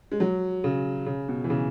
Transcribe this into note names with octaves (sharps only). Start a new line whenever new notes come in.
G#3
F#3
C#3
C#3
B2
E3
C#3